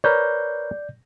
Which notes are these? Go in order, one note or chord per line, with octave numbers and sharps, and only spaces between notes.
A#4 B4 C#5 D5 G6